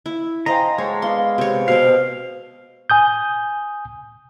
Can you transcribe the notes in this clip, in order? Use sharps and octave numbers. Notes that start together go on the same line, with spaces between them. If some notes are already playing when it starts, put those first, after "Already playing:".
E4
G#4 C5 D#5 F5 G5 A#5
G#3 F#4 A4 C5 C#5
B3 D5 F5 C6
C3 C#5
B2 C4 C5 F5
G#5 D#6 G6